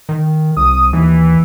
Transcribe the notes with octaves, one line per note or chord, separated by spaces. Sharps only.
D#3
C2 D#6
D#2 E3